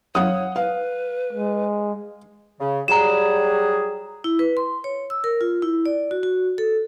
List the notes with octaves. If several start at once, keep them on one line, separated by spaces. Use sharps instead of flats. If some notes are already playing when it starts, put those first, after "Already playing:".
F#2 A3 C#5 F5 F#5 D#6
B4 F5
G#3
C#3
F#3 G3 G#4 A#5 E7
E4
B4
C6
C#5
E6
A#4
F4
E4
D5
F#4
F#4
A4